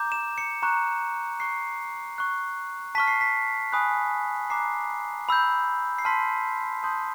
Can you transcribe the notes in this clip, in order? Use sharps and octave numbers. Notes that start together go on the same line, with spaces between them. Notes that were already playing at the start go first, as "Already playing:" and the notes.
Already playing: A#5 D6 G6
E7
C#7
A#5 C#6 F#6
C#6 F#6 C7
C#6 F#6
A5 C#6 F6 B6
C7
B6
G#5 B5 D#6 F#6
A#5 D6 F#6 C7
B5 E6 G6
C7
A5 C6 F6 B6
A5 C6 D#6 G6